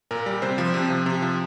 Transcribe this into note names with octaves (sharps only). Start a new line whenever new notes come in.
A#2 A#4
G3
C3 C5
F3
C3
F3
C3
F3